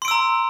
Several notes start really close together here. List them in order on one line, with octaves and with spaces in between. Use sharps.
C6 D7 E6 A#5